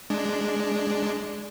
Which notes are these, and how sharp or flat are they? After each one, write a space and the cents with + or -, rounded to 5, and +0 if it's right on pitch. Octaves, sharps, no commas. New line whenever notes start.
G#3 +0 D4 +0